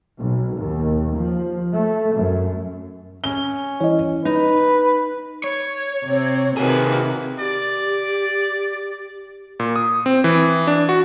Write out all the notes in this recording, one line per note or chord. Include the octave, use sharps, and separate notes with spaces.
B1
D#2
F3
A3
F#2
C#4 G7
E3 C#5 D#5
D#4 B4
C#5
C3 C4
C3 D#3 F#4 G#4 B4
G4 D5
A#2
D#6
C4
E3
D4
F#4